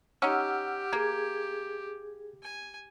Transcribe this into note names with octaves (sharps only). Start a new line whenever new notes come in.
C#4 D#4 G4 F#5 E6 F6
A#3 G#4 G#6
G#5